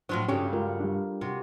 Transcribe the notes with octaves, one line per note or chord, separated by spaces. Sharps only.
A2 F3 F#3 D4 C5
G2 C#3 F#3 C#4 D4 F4 G4 A4
G#3 F4 A#4
G3 D4
C3 F#4